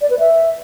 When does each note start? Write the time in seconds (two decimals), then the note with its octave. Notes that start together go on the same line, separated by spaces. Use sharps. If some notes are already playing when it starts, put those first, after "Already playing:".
0.01 D5
0.10 B4
0.19 E5